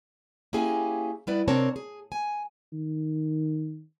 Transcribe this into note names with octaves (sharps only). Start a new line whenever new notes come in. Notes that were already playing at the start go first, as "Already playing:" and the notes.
A#3 C#4 E4 G4 G#4 G#5
G3 B3 E4 B4 D5
C3 C4 D4 A#4 C#5 A5
G#4
G#5
D#3